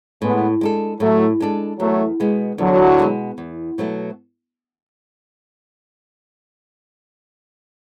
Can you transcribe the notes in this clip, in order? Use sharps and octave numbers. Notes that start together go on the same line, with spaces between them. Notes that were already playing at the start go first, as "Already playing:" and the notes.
A2 G#3 B3
G#3 D4 A4
A2 F#3 A3
G#3 D4 A4
E2 F#3 A3
B2 G#3 B3
E2 D3 F#3
B2 G#3 B3
E2
B2 F#3 A3